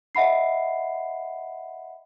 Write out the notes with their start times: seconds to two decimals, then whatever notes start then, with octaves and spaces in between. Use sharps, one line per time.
0.15 D#5 E5 F#5 B5 C7